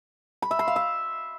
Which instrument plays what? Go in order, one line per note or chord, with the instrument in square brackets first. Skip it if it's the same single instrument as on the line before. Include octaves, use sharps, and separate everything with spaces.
[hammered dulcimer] B5
E5
C6
F5
E5